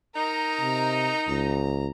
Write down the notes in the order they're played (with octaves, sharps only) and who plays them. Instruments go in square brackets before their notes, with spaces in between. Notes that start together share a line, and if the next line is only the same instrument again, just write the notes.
[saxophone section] D#4 [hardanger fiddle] A#4 A#5
[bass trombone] C3
[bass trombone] C#2 [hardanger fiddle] A#5